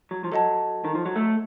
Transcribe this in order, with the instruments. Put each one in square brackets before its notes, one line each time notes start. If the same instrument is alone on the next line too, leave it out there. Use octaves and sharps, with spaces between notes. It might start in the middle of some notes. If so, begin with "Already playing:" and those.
[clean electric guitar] F#3
F3
[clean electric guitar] F#3 [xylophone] A4 D#5 F#5 A5
[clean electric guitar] D#3
F3
F#3
A3